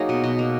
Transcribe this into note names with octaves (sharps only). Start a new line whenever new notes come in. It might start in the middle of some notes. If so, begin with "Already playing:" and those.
Already playing: F#3 A#3 D#4 G#4
B2
B2
A#3